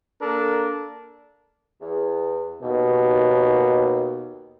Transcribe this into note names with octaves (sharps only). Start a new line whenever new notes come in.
A#3 D4 A4 A#4
E2
D#2 B2